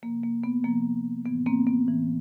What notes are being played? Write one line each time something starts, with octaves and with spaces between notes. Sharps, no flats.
C3 F3 A#3
A#3
B3
C3 F3 A#3
A2 E3 B3
A#3 C4
B3
A2 E3